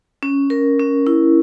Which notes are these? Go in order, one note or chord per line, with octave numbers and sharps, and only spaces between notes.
C#4
A#4
C#4
E4